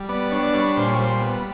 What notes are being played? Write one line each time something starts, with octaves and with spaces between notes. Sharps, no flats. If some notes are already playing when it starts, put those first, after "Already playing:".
Already playing: G3
B3 D5
D4 C#5
D5
G3 C#5
A#2 C5
C#5
G3 C5
B3